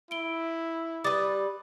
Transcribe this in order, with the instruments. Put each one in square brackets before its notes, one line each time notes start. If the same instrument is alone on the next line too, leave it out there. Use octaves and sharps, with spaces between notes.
[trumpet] E4 [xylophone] D7 G7
[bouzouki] G3 B4 [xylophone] D6 D#6 A6